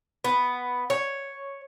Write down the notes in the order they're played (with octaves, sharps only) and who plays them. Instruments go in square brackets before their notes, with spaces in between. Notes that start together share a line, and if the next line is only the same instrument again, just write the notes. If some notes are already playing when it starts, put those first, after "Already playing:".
[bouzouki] B3
C#5